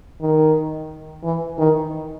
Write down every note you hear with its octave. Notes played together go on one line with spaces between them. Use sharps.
D#3
E3
D#3